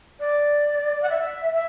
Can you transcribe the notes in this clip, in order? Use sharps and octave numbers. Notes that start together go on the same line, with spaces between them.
D5
F#5
E5
E5